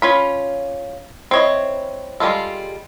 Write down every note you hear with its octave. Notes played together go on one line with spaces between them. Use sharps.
C#4 F4 B5
C4 E4 C#5 D#5
G3 G#3 F4 A4